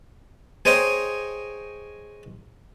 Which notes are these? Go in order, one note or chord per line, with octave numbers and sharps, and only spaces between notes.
G#4 C5 C#5 D#5 G5 A#5